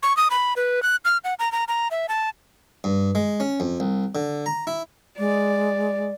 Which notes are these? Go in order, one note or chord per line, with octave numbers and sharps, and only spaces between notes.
C#6
D#6
B5
B4
F#6
F6
F#5
A#5
A#5
A#5
E5
A5
G2
G#3
C#4
F2
C2
D3
A#5
E4
G#3 D5